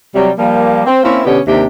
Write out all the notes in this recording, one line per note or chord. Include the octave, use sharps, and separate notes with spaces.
C3 F#3 G3
F3 G3 A#3
C4
A#3 C4 C#4 E4
B2 D3 B3 C#4 G4
D#2 C3 A#3 D4 G4